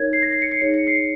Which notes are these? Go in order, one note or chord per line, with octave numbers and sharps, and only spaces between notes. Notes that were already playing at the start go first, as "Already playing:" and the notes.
Already playing: D#4 A#4 C#5 G#6
C7
A#6
C7
C#7
C7
D#4 G#4 C#5 C#7
C#7
C7